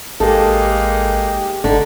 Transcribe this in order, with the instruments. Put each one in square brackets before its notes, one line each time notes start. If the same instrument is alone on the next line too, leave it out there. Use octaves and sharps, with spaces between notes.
[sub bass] A1 [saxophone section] G#3 A#3 D#4 [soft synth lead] G4 [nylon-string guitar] A4
[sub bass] G1 [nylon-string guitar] D3 [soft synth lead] D#4